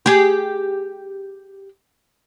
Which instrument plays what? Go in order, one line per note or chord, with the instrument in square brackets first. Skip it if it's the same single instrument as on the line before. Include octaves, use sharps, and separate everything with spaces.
[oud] G4 G#4